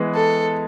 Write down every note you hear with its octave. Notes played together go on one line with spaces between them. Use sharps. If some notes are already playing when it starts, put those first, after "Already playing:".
Already playing: E3 G#3 B3
A4